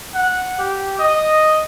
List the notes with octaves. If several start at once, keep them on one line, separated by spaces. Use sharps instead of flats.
F#5
G4
D#5